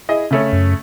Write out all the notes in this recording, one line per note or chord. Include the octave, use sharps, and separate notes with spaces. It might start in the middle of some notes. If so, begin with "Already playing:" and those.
E4 G#4 D#5
C#3 A3 C#4
F#2